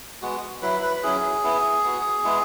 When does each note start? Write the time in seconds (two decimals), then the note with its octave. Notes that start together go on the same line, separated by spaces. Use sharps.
0.22 G#3 B3 F#4
0.62 F#3 E4 B4
0.82 B4
0.96 B4
1.03 F#3 C#4 E4 G#4
1.44 B3 E4
1.84 B3 F#4
2.24 G#3 B3 E4